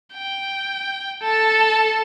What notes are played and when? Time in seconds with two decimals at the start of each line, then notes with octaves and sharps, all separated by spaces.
0.14 G5
1.23 A4 A5